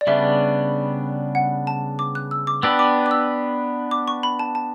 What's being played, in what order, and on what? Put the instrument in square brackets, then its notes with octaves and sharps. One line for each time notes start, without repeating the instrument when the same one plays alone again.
[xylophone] D5
[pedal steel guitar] C#3 G3 B3 D4 [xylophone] E5
[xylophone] F#5
A5
D6
F#6
E6
D6
[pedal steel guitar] B3 D4 G4 B4 [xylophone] E6
[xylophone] D6
D6
E6
D6
C#6
B5
A5
A5